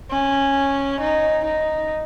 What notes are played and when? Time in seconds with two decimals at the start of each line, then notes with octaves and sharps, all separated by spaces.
0.11 C#4
1.00 D#4
1.44 D#4